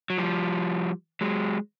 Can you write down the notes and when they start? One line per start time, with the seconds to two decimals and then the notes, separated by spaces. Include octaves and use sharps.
0.10 F#3
0.18 F3 G3
1.21 F#3 G#3